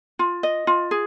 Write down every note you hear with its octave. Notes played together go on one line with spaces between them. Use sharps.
F4
D#5
F4
G#4